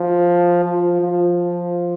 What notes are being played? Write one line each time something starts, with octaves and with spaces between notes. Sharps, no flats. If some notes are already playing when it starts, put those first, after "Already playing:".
Already playing: F3
F3
F3